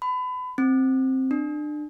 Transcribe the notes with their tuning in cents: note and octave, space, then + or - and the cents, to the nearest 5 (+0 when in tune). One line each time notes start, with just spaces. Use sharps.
B5 +30
C4 +5
D4 +30